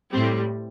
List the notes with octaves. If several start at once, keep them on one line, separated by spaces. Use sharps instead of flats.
A2 G3 C4